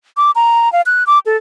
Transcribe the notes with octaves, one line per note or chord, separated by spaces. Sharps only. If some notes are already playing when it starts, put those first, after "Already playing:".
D6
A#5
F5
F#6
D6
A4